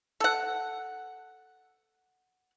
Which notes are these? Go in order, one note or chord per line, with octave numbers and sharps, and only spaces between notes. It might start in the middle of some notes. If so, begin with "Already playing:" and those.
A4 F#5